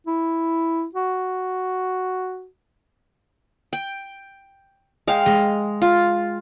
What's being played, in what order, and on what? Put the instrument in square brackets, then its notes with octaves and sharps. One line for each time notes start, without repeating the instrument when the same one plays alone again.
[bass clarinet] E4
F#4
[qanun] G5
[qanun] G#3 F5 [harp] D#5 G5
[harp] G#3 [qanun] D#5
[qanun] F4